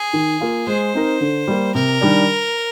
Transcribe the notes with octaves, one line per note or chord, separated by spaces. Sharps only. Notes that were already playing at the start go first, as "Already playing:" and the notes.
Already playing: G#4
D#3
A#3 F4
G#3 C5
C4 D#4 A#4
D3
G3 A#3
C3 A#4
D#3 G3 D4